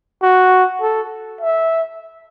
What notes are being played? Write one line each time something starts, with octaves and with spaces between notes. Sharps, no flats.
F#4
A4
E5